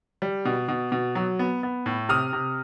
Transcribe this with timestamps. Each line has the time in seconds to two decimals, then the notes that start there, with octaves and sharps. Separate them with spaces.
0.22 G3
0.45 B2
0.68 B2
0.92 B2
1.15 F#3
1.39 B3
1.63 B3
1.86 A2
2.09 C3 D#6 F6
2.33 C3